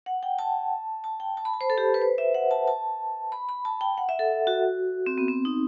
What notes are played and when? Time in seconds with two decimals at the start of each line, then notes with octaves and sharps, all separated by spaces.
0.06 F#5
0.23 G5
0.39 A5
1.04 A5
1.20 G5
1.37 A5
1.45 B5
1.54 A5
1.61 C5
1.70 A4
1.78 G4
1.94 B4
2.01 C5
2.18 E5
2.35 F#5
2.51 A5
2.67 A5
3.32 B5
3.49 B5
3.65 A5
3.81 G5
3.98 F#5
4.09 E5
4.19 A4
4.47 F#4
5.06 C4
5.18 B3
5.28 C4
5.45 D#4